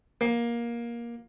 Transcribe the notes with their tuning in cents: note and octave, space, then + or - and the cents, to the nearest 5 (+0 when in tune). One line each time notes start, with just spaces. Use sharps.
A#3 +15